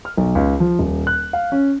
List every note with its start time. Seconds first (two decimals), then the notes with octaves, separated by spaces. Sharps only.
0.05 F6
0.17 B1
0.35 C#2
0.60 F3
0.79 D#1
1.07 F#6
1.33 F5
1.52 C#4